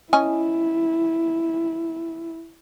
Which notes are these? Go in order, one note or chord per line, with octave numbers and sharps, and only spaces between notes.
C#4 E4 D#5 G#5